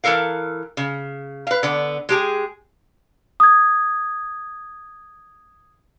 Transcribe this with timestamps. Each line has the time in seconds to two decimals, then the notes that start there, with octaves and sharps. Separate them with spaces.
0.04 E3 F4 A4 A#4 F5
0.77 C#3
1.47 B4 F5
1.63 D3 B3
2.09 G#3 G4 G#4
3.40 D#6 G#6